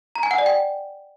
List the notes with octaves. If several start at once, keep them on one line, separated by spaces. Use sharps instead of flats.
A#5
G#5
F#5
D5
G5